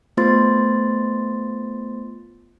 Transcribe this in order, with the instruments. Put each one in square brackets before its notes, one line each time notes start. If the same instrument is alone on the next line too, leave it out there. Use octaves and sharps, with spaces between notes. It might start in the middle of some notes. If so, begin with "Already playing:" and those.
[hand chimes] A3 B3 F4 C5 C6 A6